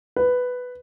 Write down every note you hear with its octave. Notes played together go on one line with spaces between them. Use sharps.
B4